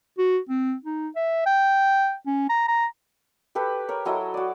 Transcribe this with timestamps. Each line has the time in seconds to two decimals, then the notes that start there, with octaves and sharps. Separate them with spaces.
0.18 F#4
0.49 C4
0.84 D#4
1.16 E5
1.46 G5
2.26 C#4
2.50 A#5
2.68 A#5
3.55 G4 A4 B4
3.88 A#4 C#5
4.05 F#3 E4 A4 D#5
4.34 F#4 D5